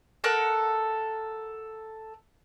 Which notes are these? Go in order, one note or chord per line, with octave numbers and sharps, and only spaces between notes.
A4 A#4 F#5 F#6